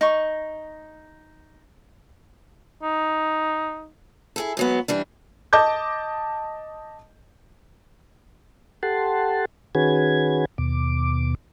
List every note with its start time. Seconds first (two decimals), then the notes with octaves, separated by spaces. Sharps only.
0.01 D#4 C#6
2.83 D#4
4.36 E4 G#4 A4
4.57 G#2 F#3 B3
4.88 E3 G3 D4
5.53 D#5 A5 D6 G6
8.83 G4 A4 F#5 A5 C6
9.75 D#3 C#4 F#4 G#4 B4 G#6
10.58 D#2 B2 D6